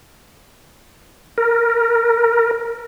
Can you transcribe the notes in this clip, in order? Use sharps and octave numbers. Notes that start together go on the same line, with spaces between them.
A#4